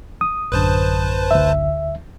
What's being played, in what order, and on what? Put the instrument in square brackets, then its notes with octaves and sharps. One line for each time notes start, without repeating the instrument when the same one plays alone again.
[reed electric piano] D#6
[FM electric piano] A1 F#2 D3 [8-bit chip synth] B4 C5 A5
[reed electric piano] D2 E5